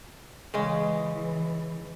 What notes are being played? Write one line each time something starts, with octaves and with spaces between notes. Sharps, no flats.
C#3 E3 G#3